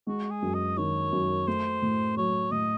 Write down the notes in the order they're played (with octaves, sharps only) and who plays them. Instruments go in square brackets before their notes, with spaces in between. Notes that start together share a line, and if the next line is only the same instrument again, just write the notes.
[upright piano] G#3 [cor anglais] F#4
[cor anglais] G#4
[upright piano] F#2
[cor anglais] D#5
[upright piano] D#3 [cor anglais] C#5
[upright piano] F#2
[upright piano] A3 [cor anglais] C5
[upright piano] A2
[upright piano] F#3 [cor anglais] C#5
[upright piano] A2 [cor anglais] D#5